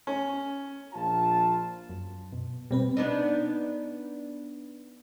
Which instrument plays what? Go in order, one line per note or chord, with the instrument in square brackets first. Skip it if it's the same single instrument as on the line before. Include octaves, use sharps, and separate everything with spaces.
[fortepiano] C#4
[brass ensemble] A#1 F4 A5
[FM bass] F#2
B2
[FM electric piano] B2 C4 B4 [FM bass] G3
[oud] B3 D4 D#4